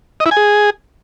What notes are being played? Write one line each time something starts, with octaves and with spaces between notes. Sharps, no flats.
D#5
E4
G#5
G#4